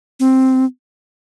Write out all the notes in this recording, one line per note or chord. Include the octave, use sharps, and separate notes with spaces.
C4